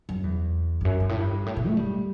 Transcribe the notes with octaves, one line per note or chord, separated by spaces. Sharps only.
F#2
E2
G2
F#2
G2
A2
G2
A2
B2
A3
G3